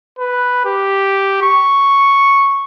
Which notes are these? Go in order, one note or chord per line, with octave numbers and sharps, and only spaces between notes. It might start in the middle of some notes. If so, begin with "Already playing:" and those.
B4
G4
C#6